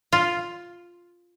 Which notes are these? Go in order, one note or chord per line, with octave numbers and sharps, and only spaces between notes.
F4